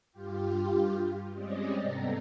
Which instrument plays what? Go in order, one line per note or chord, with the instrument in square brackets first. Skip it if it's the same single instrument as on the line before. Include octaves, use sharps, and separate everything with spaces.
[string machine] G2 F4 G4
G3 G#3 C4 C#4 D5 D#5
G#2 C3 B3 A4 A#5